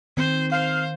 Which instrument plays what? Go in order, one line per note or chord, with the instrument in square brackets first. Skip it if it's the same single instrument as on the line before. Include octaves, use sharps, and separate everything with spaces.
[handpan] D#3 [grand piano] C4 [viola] C5
[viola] C5 [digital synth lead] F5